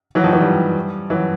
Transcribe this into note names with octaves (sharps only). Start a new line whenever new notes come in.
E3 F#3
D#3 F3
E3 F#3
F3 G3
E3 F#3